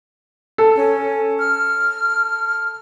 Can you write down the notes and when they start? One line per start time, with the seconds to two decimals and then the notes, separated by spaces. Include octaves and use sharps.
0.58 A4
0.76 C#4
1.39 F6